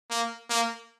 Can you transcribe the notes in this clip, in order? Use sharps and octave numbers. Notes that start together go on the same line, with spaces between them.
A#3
A#3